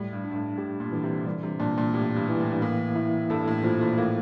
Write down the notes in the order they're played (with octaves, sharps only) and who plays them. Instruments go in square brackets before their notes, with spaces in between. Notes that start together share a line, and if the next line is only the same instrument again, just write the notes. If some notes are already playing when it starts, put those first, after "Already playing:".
Already playing: [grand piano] A2 [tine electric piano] G3
[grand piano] G2
[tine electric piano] D4
[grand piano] G2
A2
[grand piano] A2 [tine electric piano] G4
[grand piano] A#2
[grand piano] D3 [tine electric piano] E3
[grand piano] C3
[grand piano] D3 [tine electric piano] G3
[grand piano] C3
[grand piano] A#2 [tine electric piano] D4
[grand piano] A#2
[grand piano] A2 [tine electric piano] G4
[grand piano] G2
[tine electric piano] E3
[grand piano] A2
G2
[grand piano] A2 [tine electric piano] A#3
[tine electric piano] E4
[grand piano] G2 [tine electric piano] A4
[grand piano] A2
[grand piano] A#2 [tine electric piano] F3
[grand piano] A#2
[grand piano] A2 [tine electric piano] A#3